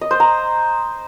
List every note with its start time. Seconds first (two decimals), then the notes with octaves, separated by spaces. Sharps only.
0.01 D#5
0.11 C5
0.20 A#5